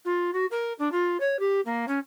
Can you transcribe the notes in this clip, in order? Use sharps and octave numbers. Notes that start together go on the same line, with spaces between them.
F4
F#4
A#4
D4
F4
C#5
G4
A#3
C#4